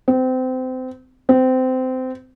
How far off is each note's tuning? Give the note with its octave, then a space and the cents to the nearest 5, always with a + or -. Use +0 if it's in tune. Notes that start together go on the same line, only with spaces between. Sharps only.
C4 -25
C4 -20